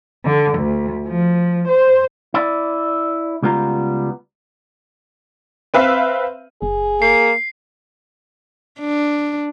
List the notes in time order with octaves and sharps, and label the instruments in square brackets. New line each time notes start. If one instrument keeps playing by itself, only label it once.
[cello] D3
D2
F3
C5
[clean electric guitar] E4 D5
C#2 G3 B3 F4 A#5
[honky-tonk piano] C4 B4 E5 F5
[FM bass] F#1 [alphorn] G#4
[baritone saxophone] A#3 [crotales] C7
[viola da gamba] D4